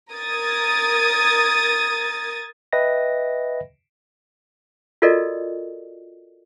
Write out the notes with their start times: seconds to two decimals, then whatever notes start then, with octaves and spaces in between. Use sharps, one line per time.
0.11 A#4 D#6 G#6 A6
2.73 B4 D#5 E5 G5 B5 A#6
5.02 F4 F#4 A4 A#4 D5 D#5